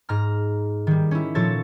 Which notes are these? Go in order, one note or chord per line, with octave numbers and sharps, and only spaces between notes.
G#2 A#5 F6
D#3 G3
C#4 E4
A#2 F3 A4 C#5 A6